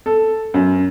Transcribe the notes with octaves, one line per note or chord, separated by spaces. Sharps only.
A4
F#2